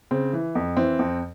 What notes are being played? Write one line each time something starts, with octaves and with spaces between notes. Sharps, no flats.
C#3 C4
E3
F2
E3 C4
F2